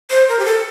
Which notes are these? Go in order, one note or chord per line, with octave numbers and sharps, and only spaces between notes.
C5
A#4
G4
A4